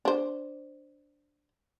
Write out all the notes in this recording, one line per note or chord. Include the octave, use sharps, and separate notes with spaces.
D4 C5